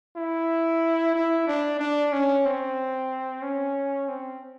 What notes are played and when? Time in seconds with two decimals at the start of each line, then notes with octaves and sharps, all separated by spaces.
0.17 E4
1.15 E4
1.48 D4
1.79 D4
2.12 C#4
2.45 C4
3.42 C#4
4.08 C4